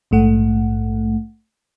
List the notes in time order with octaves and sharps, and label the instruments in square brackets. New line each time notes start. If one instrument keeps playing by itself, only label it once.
[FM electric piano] A#1 G#2 A3 F#5